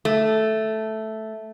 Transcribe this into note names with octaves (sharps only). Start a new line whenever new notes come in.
A3